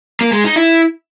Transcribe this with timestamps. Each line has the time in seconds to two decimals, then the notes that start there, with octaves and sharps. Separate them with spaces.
0.21 A#3
0.32 G#3
0.44 D#4
0.56 E4